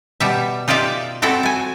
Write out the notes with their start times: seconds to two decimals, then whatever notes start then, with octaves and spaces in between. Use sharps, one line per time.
0.20 B2 G3 E5
0.68 D#4 F4 G4 D5 E5
1.22 C4 E4 F#4 A4 E5
1.43 A4 G#5